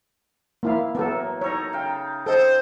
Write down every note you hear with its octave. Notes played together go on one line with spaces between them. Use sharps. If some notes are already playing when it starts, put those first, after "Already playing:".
A#3 E4 F5
A2 F#3 A#3 B3 A4
D#4 A4 C#5 A#5
C#3 F5 G5
A4 C5 D#5